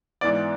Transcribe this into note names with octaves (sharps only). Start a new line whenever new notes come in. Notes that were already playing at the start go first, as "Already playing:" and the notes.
G#2 E3 B3 D5